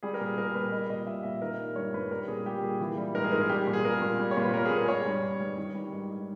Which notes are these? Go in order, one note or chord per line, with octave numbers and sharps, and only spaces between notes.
G3 G#4
A#4
A#2
G#4
G3 A#4
A#2 B4
G3 D#5
A#2 D#5
G3 E5
A#2 E5
D#3 A#4
G3
G2 C#5
G2 B4
G3 A#4
A#2 G#4
G3 G4
A#2 G#4
E3
G3
G#2 A#4
G#4
G#2 A#4
G#4
G3 G4
A#2
G#4
G3 A#4
A#2
G3
C#5
A#2
B4
G3 A#4
G#4
A#2
A#4
G3 C#5
G2
G3
G2
D#3
G3
G#2
G#2